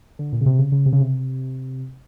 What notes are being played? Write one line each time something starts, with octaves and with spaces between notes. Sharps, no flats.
D3
A#2
C#3
C3
C#3
C#3
C3
C#3
C3